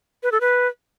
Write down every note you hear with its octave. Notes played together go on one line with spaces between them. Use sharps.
B4
A4
B4